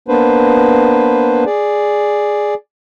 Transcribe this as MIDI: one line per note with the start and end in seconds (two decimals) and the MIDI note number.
0.08 1.44 58
0.08 1.44 59
0.08 1.44 62
0.08 1.44 71
0.08 1.44 72
1.46 2.54 68
1.46 2.54 74